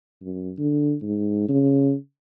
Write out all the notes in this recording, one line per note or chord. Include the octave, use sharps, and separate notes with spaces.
F#2
D3
G#2
C#3